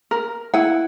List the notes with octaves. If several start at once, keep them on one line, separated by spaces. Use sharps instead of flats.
A#4
E4 F#5